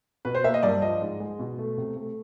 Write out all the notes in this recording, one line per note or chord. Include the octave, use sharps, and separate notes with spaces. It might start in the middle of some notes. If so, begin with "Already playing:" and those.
B2 B4
C5
A#3 E5
D#5
G2 D5
F3 D#5
G#2
G#3
B2
A3
C3
A3